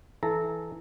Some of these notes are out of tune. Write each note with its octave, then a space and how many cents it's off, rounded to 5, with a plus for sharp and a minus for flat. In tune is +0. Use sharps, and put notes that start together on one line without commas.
E3 +0 A4 -20 A#5 -20